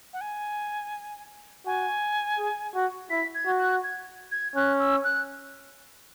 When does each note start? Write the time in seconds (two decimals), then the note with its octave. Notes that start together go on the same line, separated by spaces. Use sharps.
0.13 F#5
0.21 G#5
1.65 F#4 G#5
2.38 G#4
2.75 F#4
3.10 E4 B6
3.35 G#6
3.46 F#4
3.59 F#6
3.84 G#6
4.32 G#6
4.56 C#4 F#6
4.79 E6
5.04 F#6